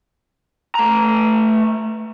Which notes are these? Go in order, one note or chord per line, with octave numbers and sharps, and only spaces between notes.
A3 A#5